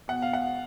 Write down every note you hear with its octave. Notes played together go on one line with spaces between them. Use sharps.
B2 F#5
F5
F#5